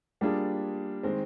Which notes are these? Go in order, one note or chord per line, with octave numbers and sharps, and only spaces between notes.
G3 A#3 D4 F4 G#4
D#3 G#3 C4